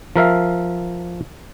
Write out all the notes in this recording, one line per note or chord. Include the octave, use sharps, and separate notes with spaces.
F3 A#4 E5 F5